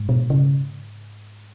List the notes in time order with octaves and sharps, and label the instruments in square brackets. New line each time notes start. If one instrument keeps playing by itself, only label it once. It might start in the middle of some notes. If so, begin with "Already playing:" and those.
Already playing: [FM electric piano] G#2
[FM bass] B2
C#3